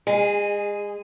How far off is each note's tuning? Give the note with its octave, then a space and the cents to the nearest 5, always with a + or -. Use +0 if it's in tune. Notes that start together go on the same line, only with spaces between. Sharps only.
G#3 -30 G#4 +0